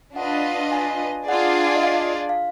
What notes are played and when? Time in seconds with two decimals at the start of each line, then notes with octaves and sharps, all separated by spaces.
0.16 D4 F4 B4 D#5 F#5
0.72 G#5
1.28 D4 F4 G#4 D5 F#5
1.76 D#5
1.83 F5
2.29 F5